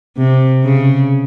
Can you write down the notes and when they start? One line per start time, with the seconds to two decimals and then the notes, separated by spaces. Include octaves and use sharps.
0.18 C3
0.63 C#3